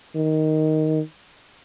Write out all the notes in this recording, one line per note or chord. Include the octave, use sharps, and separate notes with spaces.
D#3